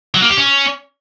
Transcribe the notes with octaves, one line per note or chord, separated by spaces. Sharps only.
F#3
A#3
G4
C#4